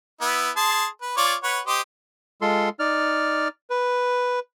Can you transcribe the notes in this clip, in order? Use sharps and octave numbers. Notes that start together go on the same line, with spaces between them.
B3 E4
G#4 A5 C6
B4
F4 C#5 D5
B4 C#5 F#5
G4 C5 D#5
G#3 F4 A4 C6
D#4 D5 F6
B4